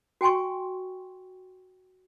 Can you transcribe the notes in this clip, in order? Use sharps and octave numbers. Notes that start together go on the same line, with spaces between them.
F#4 G5 G#5 C6 C#6